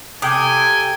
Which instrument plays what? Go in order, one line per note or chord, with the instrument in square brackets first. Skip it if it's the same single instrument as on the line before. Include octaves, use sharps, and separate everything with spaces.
[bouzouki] C3 [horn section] A4 G5 [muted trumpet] G#5 [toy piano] D6 D#6